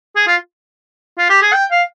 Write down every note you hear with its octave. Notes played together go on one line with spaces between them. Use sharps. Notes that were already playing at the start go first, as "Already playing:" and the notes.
G#4
F4
F4
G4
G#4
G5
F5